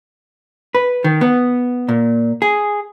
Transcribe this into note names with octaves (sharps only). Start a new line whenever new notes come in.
B4
D#3
B3
A#2
G#4